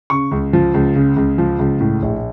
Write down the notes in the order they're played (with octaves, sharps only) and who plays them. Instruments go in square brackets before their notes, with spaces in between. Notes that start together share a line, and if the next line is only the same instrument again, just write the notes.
[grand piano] C#3 C#6
C#2
F3
C#2
C#3
C#2
F3
C#2
A2
A#1